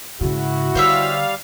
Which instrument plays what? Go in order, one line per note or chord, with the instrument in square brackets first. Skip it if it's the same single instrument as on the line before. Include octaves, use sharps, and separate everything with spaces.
[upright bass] G#2 C#3 [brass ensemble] E4 F#4
[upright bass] D3 [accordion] G3 F5 [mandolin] C5 C#5 E5